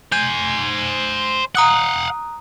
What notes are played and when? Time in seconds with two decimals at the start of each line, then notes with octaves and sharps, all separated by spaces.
0.12 C5 G#5 G6
1.55 F5 F#5 A#5 D#6 F#6